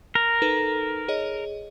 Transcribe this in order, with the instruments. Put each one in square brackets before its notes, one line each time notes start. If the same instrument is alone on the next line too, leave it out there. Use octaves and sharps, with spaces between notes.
[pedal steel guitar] A#4
[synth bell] D#4 A4 B4
G#4 C#5 D#5